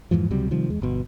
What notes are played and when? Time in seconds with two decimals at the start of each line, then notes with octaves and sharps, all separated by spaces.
0.11 F2 G#2 E3 F3
0.30 C#2 C3 F#3 G3
0.51 C3 D#3 F3 G3
0.70 E2 G#3
0.82 G1 B2